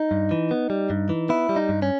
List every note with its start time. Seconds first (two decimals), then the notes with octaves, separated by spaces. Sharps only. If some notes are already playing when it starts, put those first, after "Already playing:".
Already playing: D#4
0.11 G2
0.31 E3
0.51 B3
0.70 G3
0.90 G2
1.09 E3
1.29 B3 E4
1.49 G3
1.56 D#4
1.69 G2
1.82 C#4